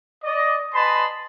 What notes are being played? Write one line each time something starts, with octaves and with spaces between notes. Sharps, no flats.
D5 D#5
B4 D#5 G#5 A5 B5 C6